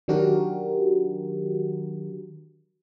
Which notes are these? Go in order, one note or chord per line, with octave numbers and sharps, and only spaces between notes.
D#3 F#3 D4 F#4 G4 A#4